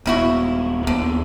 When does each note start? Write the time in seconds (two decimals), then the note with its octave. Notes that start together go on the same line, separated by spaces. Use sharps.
0.06 D#1 C#3 B3 E4 F#4
0.87 D#2 D3 B3